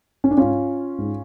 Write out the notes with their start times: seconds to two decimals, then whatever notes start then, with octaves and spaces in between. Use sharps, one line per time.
0.24 C#4
0.31 D4
0.37 G#2 C#4 F4
0.98 G#2